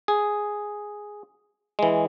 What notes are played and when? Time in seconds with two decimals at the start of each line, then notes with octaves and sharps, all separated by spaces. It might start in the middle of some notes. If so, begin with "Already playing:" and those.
0.08 G#4
1.79 E3 G#3